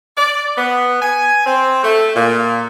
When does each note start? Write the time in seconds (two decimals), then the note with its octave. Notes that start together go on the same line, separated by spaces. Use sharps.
0.18 D5
0.57 B3
1.02 G#5
1.46 C4
1.83 A3
2.15 A#2